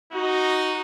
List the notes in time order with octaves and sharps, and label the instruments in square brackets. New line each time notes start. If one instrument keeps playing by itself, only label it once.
[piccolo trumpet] D#4 [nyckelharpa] F#4